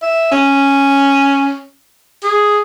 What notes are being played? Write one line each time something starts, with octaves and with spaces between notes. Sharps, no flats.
E5
C#4
G#4